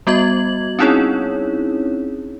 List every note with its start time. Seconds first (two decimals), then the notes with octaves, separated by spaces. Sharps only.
0.07 G3 B3 F#4 D#5 G#6 F#7
0.79 C4 C#4 D#4 E4 G#4 C#5